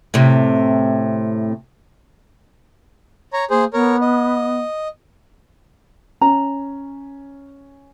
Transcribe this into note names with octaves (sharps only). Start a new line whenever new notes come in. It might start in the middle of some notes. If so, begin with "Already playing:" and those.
A2 C3
C#5 A#5
A#3 G#4 C5
B3 A#4 C#5
D#5
C#4 A#5